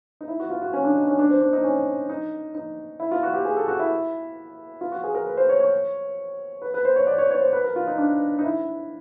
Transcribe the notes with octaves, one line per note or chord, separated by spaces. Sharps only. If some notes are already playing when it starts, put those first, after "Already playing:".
D#4
E4
F#4
F4
F#4
C#4
D4
D#4
C#4
D4
C4
D4
D#4
C#4
D#4
D#4
E4
F4
F#4
G4
G#4
A4
F#4
E4
F4
F#4
G#4
A#4
B4
C5
C#5
C#5
B4
B4
C5
C#5
D5
C#5
C#5
C5
B4
A#4
F4
D#4
D4
D#4
E4